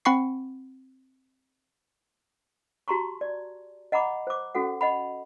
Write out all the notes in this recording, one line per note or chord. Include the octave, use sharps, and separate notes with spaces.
C4 F#5 B5 C#6 C7
F#4 G4 A5 A#5 C6 C#6
D5
D#5 F#5 A#5 B5 D6
C5 D6
C#4 F#4 A4 F#5
D#5 F#5 B5